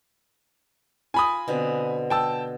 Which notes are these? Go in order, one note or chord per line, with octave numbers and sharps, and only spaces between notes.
F4 A#4 G#5 B5 D#6
B2 D3 C4
G5 A5 E6